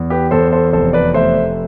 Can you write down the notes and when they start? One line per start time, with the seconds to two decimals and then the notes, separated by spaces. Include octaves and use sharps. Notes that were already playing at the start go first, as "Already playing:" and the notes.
Already playing: E2
0.10 G4 B4
0.31 E2 A4 C5
0.52 A4 C5
0.73 F1 A4 C5
0.93 B4 D5
1.14 A3 C5 E5